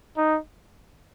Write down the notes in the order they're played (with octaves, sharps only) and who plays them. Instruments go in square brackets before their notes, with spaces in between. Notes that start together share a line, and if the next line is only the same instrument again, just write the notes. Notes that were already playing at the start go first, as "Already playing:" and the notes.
[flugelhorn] D#4